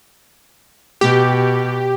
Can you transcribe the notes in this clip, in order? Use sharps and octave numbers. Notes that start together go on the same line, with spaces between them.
B2 G4